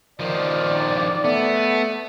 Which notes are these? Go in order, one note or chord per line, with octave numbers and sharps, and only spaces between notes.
D#3 F3 D5
A3 B3